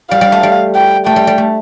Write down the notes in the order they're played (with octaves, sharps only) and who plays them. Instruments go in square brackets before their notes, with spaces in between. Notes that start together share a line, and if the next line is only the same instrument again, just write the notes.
[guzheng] G3 [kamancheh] F5
[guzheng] G3
A3
G3
[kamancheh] G5
[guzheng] A3 [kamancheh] G5
[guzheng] G3
G3
A3